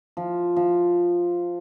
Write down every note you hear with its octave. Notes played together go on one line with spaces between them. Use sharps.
F3
F3